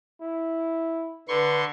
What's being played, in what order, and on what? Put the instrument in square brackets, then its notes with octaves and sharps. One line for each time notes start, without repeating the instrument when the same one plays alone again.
[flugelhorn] E4
[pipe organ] D3 C6 C#6 [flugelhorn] B4